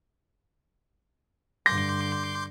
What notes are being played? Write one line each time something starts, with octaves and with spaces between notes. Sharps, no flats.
G2 D3 C6 D6 G6 A#6